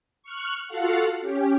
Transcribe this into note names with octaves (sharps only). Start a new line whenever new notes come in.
C#6 F6 F#6
F4 F#4 A4 F5 F#5
C#4 G4